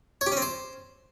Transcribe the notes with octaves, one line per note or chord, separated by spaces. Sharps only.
C#5
G4
C#4
C4
C5